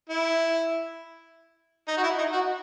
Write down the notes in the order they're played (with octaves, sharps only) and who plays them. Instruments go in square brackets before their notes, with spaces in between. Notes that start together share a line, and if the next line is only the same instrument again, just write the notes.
[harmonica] E4
D#4
F#4
E4
D#4
F#4